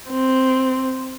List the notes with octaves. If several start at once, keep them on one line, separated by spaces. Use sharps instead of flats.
C4